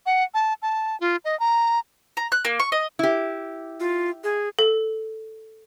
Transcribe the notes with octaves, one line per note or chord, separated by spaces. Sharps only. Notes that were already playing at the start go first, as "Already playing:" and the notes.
F#5
A5
A5
F4
D#5
A#5
A#5
F#6
A#3
C#6
D#5
E4 G4
F4
G#4
A4